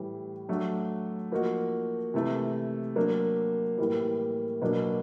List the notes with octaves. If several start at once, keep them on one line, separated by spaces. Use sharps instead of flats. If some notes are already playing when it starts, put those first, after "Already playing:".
Already playing: A2 E3 G3
F#3 A3 D4 F#4
F3 A#3 D#4 F#4
C3 E3 A3
F#3 A#3 D4
A2 E3 G3 A#3
B2 F#3 A#3 D4